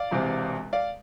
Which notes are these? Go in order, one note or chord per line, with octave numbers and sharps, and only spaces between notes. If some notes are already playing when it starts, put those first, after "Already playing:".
Already playing: D5 F5
E1 E2 C3
D5 F5